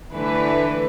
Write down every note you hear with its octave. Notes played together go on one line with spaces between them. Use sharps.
D3 E3 A3 B4